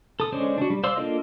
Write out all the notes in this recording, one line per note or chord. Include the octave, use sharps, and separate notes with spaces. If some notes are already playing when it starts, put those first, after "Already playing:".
A4 D#6
D3 G#3 C#4 C5 D5
D4 F#4
G3
C5 D5 F5 C6 E6
A#3 D4 F4 A4 D#5